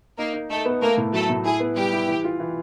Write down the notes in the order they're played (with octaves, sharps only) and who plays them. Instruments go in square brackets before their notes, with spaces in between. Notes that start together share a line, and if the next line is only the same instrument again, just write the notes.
[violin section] A#3 A#4 [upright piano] D#4
[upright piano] D#4
[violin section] A3 A4 [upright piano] D#4
[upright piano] B3
[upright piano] A3 [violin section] A#3 A#4
[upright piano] A2
[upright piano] F#3 [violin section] A3 A4
[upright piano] A2
[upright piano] E4 [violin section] G#4
[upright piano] B3
[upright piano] G3 [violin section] G4
[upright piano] E4
E3
F4
E3